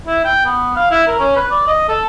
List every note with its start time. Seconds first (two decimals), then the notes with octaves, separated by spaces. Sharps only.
0.07 E4
0.25 G5
0.45 B3
0.76 F5
0.91 E4
1.07 A#4
1.19 C#4
1.36 B4
1.51 D5
1.67 D#5
1.88 A4